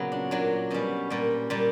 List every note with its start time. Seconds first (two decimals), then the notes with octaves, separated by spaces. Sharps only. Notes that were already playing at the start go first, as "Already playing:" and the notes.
Already playing: A#2 C#3 F#3 B3
0.12 D4
0.31 A#2 F#3 D4
0.71 B2 G3 C#4
1.10 A#2 G3
1.50 A#2 G3